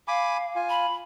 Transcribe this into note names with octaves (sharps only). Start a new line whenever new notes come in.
F5 G#5 B5 D6
F4 G#5
B5